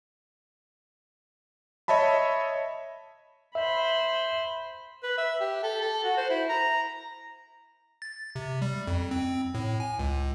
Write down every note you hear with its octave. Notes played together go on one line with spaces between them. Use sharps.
C#5 D#5 E5 A5 B5
C5 E5 B5
B4
E5
G4
A4
A4
F#4
C5
E4
A#5
A6
C3
G3
F2
C4
A2
G#5
C#2